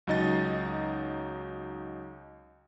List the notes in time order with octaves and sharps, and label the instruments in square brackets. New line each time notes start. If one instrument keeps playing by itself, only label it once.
[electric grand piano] C#2 F#3 D#4 D#5 A6